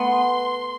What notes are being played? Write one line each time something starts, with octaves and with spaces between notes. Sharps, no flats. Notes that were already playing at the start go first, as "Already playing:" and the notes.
Already playing: A3 B3 C6